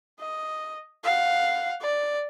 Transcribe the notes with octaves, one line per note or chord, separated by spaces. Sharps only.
D#5
F5 F#5
D5